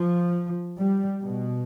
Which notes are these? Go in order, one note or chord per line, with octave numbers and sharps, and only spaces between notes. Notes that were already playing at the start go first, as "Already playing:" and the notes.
Already playing: F3
G3
B2